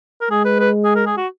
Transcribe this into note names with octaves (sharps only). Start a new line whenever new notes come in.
A#4
G#3 G#4
B4
B4
G#4
A#4
G#4
F#4